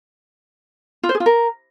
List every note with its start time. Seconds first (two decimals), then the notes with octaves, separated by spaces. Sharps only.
1.03 F4
1.09 C5
1.15 G#4
1.20 F4
1.26 A#4